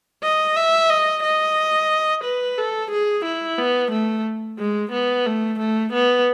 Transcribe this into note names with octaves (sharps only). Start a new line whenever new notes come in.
D#5
E5
D#5
D#5
B4
A4
G#4
E4
B3
A3
G#3
B3
A3
A3
B3